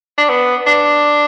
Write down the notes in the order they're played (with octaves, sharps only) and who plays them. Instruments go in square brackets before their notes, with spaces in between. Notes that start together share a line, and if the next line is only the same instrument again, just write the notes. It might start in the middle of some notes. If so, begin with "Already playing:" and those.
[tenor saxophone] D4
B3
D4